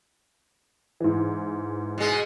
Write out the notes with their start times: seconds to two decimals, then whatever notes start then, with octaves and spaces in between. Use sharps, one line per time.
1.00 G#2 E3
1.98 B2 G#3